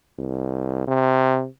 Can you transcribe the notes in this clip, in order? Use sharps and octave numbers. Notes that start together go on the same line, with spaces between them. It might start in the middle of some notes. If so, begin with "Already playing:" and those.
C2
C3